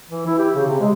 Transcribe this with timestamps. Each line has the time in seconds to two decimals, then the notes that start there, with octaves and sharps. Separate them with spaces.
0.09 E3
0.26 E4
0.38 G4
0.54 C#3
0.67 C3
0.80 G#3